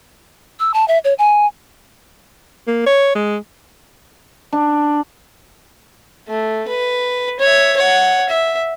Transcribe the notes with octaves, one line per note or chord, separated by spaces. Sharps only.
E6
A5
E5
C#5
G#5
A#3
C#5
G#3
D4
A3
B4
C#5 E5
C#5 F#5
E5